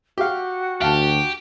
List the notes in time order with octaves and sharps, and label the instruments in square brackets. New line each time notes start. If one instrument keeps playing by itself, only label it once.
[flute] F#4 [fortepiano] G4 F5
[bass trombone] D2 [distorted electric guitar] G4 [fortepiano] F5 A5